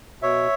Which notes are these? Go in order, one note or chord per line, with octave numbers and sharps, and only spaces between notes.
B2 C#5 E5